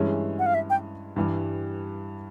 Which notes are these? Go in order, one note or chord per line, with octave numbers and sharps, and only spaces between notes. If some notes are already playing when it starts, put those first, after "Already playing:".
Already playing: G2 E3 G#3 C#4 E4
F#5
F5
E5
G5
G2 E3 G3